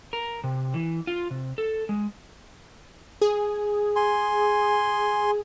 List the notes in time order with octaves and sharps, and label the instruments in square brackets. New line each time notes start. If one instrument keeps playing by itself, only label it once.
[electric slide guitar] A#4
C3
E3
F4
C3
A4
G#3
[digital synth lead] G#4
[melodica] G#5 C6